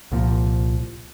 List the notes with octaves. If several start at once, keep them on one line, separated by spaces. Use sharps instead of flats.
C2 A#2 F3